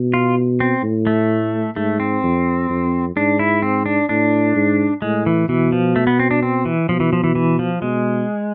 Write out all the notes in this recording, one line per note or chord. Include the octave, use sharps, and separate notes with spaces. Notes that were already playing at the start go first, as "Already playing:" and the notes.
Already playing: B2
F4
C4
A2
A3
G#2 A3
C4
F2
F2
G#2 D4
E4
C4
D4
A2 D4
G#2
A2 G#3
E3
B2 E3
F3
A3
B3
C4
D4
C4
E3
B2 F3
E3
F3
E3
E3
F3
B2 G#3